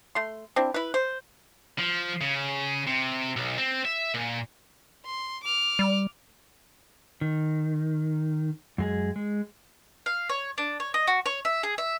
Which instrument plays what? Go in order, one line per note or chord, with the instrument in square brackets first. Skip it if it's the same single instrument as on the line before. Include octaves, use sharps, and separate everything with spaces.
[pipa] A3 C6
C4 D4 E4
E4 B4
C5
[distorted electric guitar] F3
C#3
C3
B1
C4
E5
A#2
[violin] C6
D6 F6
[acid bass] G3
[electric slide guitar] D#3
F#2 G#3 G#4
G#3
[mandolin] F5
C#5
D4
C#5
D#5
F#4
C#5
E5
G#4
E5